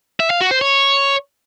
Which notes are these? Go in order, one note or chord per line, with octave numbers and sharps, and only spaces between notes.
E5
F5
F#4
C5
C#5